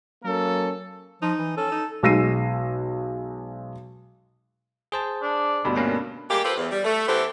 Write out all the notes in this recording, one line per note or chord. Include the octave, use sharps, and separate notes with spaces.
F#3 A#3 C#4 A4
F3 D#4
E3
C#4 A4
D#4
B1 G#3 E6 A#6 C7 D#7
G#4 C5 A5
D4
D2 G2 B2
A#3 C#4 D4 B4
G3 G#3 A#3 G4
F4 G4 A4 B4 C5
E2
G3
A3
E3 B3 E4 G4 A4 C5